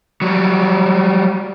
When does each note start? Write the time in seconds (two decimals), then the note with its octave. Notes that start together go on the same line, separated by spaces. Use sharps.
0.22 F#3 G3